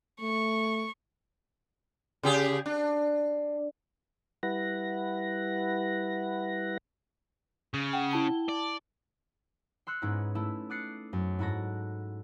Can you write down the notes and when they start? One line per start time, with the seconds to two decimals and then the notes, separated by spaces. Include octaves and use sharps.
0.21 A3 C#6
2.23 C#3 G4 G#4
2.66 D4
4.43 G3 E4 B4 F#5 A#6
7.74 C#3
7.93 F#5 G5
8.11 E4 A5 G7
8.49 D5
9.87 C6 E6 F#6 C#7
10.02 G#2 G#3 B3 C#4 D#4 E4
10.35 A3 E4 E6
10.70 D6 D#6 F#6 A6 C7 C#7
11.13 F#2
11.39 G#2 E4 F#4 A4 A#6